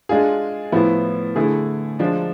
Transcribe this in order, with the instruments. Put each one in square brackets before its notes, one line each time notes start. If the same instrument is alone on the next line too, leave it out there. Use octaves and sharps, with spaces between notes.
[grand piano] G#3 D4 F4 G#4
A2 F3 B3 E4
D3 A3 E4 G#4
F3 G#3 D4